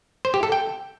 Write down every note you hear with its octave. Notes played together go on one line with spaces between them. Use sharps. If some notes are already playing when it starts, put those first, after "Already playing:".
C5
G4
A4
G5